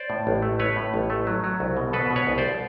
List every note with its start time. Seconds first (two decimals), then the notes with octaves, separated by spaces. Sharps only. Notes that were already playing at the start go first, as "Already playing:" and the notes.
Already playing: C5 D5
0.10 A2
0.27 A1
0.42 A3
0.59 A3 B4 C#5
0.76 A2
0.94 A1
1.10 A3
1.27 F#3
1.44 F#3
1.60 C2
1.77 B2
1.93 B2 A4 B4
2.10 B2
2.16 B4 C#5
2.27 C2
2.38 C5 D5